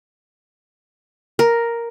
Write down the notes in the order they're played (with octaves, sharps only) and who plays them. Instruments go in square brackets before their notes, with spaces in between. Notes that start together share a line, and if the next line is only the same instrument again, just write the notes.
[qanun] A#4